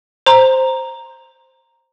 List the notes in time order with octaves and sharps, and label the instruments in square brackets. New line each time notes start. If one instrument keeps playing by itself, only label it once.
[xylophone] C5 A#5 C6